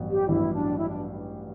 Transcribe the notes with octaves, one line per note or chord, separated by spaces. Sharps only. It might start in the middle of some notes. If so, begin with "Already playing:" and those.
Already playing: A1 G2 F#3 B3
G4
A1 G2 F#3 B3 E4
D4
E4
D4